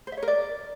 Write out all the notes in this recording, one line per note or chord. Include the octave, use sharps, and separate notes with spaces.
C5
E5
C#5
A#4
D5